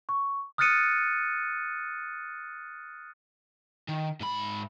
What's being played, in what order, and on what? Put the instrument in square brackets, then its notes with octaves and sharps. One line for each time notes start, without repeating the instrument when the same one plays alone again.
[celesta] C#6
[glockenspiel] D#6 F6 F#6 A6 C#7 D#7
[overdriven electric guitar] D#3
G#2 B5